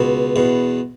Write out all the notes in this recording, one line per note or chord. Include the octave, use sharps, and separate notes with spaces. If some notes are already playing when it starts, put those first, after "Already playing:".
Already playing: C#2 B2
E2 B2